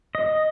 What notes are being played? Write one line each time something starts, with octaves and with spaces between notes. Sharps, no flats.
D#5